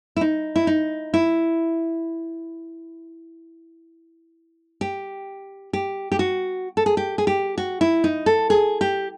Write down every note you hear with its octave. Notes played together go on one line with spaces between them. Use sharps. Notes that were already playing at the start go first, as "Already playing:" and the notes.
E4
D#4
E4
D#4
E4
G4
G4
G4
F#4
A4
G#4
G4
G#4
G4
F#4
E4
D#4
A4
G#4
G4